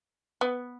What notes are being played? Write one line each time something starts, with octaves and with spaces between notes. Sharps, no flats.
B3